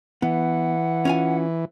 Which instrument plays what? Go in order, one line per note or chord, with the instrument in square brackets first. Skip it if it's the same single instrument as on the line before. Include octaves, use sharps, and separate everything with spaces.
[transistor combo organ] E3 [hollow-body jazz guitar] B3 [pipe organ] F#5
[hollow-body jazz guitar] C#4 F4 G#5